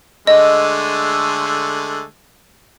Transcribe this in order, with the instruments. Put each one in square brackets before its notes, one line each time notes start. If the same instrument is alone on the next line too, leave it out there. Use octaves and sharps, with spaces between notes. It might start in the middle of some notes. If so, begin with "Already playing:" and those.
[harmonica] D3 G#3 A3 [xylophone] D#5